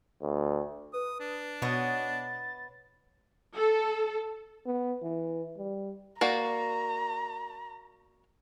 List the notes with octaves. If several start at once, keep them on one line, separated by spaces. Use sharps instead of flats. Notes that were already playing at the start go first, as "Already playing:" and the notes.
D2
B4 D#6
D4
B2 B3 C#5 D#5 A6
A4
B3
E3
G3
A#3 F#4 D5 A#5